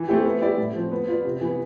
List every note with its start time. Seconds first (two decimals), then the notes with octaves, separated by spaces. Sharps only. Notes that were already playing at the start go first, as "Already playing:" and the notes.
Already playing: E3
0.08 A3 C4 E4 G4
0.25 B3
0.41 E4 G4 D5
0.58 A2
0.75 F3 C4
0.91 B3
1.08 F4 B4 D5
1.25 C3
1.41 E3 B3